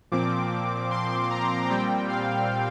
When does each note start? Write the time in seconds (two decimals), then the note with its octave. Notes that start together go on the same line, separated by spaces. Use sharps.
0.12 A#2 F3 C4 D6
0.91 C6
1.30 A#5
1.70 A#2 G3 C4 G5
2.09 F5